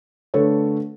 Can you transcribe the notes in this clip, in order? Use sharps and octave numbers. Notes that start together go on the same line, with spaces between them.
D3 A3 A4 B4 C#5